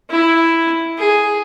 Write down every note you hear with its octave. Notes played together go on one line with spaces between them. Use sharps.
E4
G#4